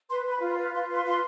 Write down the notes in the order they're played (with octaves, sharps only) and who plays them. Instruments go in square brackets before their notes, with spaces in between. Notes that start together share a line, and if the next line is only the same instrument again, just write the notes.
[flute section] B4 C6
B4
B5
F4
C6
B4
F4 C6
B4
C6
F4 C6